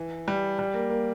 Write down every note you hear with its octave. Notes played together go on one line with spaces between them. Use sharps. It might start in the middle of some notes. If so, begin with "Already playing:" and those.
Already playing: E3
G3
G3
A#3
A#3